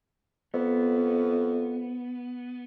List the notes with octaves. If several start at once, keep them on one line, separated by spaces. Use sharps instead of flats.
F2 B3